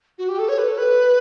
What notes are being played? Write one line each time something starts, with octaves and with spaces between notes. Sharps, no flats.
F#4
G4
A4
C#5
B4
A4
B4